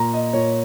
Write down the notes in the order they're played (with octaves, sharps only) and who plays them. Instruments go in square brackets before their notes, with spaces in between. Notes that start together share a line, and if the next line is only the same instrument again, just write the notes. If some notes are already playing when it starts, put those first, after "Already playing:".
Already playing: [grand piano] A#2 A#5
D#5
A#2 C#5